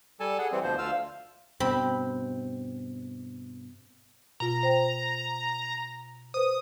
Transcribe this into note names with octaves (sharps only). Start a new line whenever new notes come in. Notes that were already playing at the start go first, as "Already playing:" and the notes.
G3 A4 G#5 A5
G#4 F#5
E3 G3 C4
D2 B2 F3 C5
D2 F4 F5 E6
G2 B2 C4 B5
B2 F4 A#5
C5 G5
B4 C5 D#6